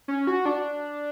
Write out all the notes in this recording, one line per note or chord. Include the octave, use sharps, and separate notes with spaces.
C#4
F#4
D4